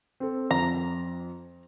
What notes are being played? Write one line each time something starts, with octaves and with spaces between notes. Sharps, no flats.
C4 A4
F2 A#5